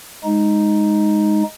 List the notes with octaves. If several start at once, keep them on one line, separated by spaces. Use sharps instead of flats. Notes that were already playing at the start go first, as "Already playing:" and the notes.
G#3 D#4